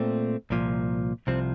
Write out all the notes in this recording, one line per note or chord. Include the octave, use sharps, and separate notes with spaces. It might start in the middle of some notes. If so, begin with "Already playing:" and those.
Already playing: A#2 A3 C4
C2 A#2 F3
C2 C3 F3 C4